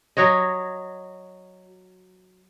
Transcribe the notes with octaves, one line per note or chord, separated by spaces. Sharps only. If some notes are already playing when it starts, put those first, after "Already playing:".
F#3 F#4 C#5 D#5